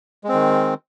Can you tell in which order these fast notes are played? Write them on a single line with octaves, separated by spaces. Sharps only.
G#3 C4 D#3